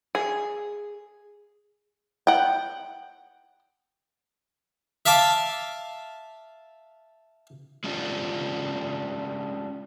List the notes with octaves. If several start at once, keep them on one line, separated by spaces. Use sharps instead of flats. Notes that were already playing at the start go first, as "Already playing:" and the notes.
G#4
F#5 G5
E5 F5 A5 D6
G#3 C#4 D4 E4 F4 G4